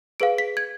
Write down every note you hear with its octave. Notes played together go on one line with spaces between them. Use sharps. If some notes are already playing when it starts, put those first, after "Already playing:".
G#4 B4 F5 D7
B6
G#6